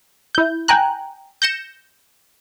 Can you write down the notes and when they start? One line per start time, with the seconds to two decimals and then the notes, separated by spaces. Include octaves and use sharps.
0.35 E4 G6
0.68 G5 G#5 A#5 F#6
1.42 G6 A#6 C#7 E7